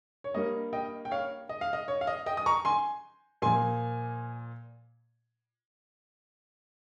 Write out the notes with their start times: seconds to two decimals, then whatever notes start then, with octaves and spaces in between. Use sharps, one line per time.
0.24 C#5
0.34 G2 G3 A#3 D#5
0.73 D#5 G5
1.05 G5
1.11 C#5 F5
1.49 D#5
1.61 F5
1.73 D#5
1.88 C#5
2.01 F5
2.07 D#5
2.26 D#5 G5
2.37 D#6
2.46 A#5 C#6
2.65 G#5 C6
3.42 A#2 F3 A#3 G#5 C6